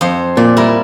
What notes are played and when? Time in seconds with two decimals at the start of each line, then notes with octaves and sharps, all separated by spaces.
0.01 F2 C5
0.37 A#2 D5
0.57 G3 E4 A#4